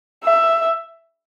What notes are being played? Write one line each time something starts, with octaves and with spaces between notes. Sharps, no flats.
E5